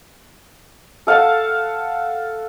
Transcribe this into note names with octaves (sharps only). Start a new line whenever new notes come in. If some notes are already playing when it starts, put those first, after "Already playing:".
A4 F5 F#5 A5